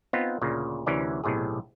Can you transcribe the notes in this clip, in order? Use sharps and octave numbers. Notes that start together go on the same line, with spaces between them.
B3 C4 D#4 F4
D2 A#2 C#3
D2 C3 E3 C#4 A#4 D5
B1 A2 C3 G#4